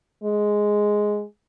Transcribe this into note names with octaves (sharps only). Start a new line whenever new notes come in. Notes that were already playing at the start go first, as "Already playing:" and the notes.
G#3